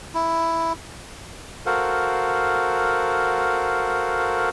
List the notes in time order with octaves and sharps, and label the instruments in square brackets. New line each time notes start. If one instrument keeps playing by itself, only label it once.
[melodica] E4
[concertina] F#4 A4 A#4 C5 F5 F#5